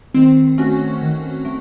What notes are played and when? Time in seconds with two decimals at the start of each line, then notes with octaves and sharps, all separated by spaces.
0.14 D#3 C4
0.58 A3 C#4 F#4
1.02 D#3
1.45 A3